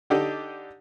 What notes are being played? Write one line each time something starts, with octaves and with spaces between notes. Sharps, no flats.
D3 D4 D#4 G4 A4